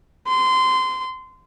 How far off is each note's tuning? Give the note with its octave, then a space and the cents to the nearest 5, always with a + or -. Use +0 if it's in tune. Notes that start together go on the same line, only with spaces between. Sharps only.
C6 -20